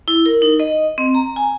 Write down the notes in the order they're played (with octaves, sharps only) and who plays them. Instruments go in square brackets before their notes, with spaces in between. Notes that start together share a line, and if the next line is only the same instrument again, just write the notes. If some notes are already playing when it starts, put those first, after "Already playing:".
[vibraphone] E4
A#4
D#4
D#5
C4
A#5
G#5